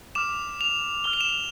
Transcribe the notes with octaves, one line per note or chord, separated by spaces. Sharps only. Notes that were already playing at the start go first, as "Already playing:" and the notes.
D6 F6 E7
F7
D6 F6 G7
F7
E7
F7